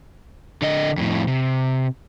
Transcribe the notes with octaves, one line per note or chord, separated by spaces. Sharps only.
D3 D#5
F2 A2
C3